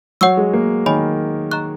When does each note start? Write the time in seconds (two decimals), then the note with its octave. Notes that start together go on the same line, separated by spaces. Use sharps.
0.21 F#3 C#5 F#5 C#6 E6
0.37 G#3
0.53 A#3
0.86 D#3 C#5 G#5 B5
1.51 D#5 A#5 C#6 F#6